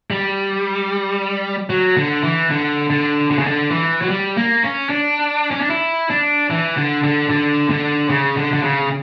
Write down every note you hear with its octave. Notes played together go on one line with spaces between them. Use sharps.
G3
F#3
D3
E3
D3
D3
D3
C#3
D3
E3
F#3
G3
A#3
C#4
D4
C#4
D4
E4
D4
E3
D3
D3
D3
D3
C#3
D3
D3
C#3